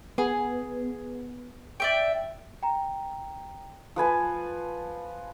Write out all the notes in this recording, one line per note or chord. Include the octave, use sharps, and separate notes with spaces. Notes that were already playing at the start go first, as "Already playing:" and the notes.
B3 G#4
D5 E5 G5
G5 A#5
F3 B4 G#5 A5